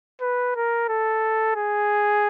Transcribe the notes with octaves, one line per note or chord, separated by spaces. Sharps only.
B4
A#4
A4
G#4